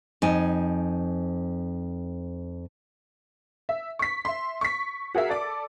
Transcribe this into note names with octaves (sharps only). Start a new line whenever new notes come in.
F2 D#4 G#5
E5
C#6 B6
E5 C6
C#6 B6
F#4 G#4 A#4 E5 F#5
A4 D5 D6